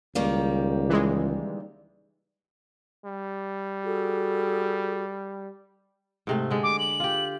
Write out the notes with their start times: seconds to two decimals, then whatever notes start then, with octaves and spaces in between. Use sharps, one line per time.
0.15 C#2 D#3 G3 A#3
0.90 E3 G#3
3.05 G3
3.85 F#4 G#4 A4
6.27 G#2 C3 A3
6.51 D3 G#3
6.63 D6
6.79 F#7
7.00 F4 G4